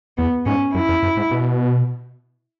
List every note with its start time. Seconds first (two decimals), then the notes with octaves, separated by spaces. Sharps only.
0.17 E2 B3
0.46 G#2 C#4
0.74 F#2 E4
0.89 E2
1.03 F#2
1.17 G#2
1.31 B2